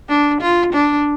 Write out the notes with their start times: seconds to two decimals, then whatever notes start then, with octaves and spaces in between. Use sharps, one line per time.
0.09 D4
0.41 F4
0.73 D4